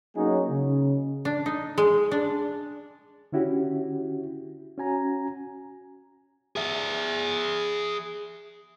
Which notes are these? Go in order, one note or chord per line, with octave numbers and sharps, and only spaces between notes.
F#3 A#3 C#4 D#4 F#4 G#4
C#3
D4
D#4
G#3
D4
D3 C#4 E4 F#4 G4
C#4 F#4 G#5 A#5
G#4 E5